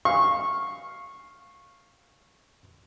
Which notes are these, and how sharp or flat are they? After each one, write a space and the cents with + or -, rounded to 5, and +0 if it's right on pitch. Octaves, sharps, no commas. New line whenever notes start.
F5 +0 C#6 -15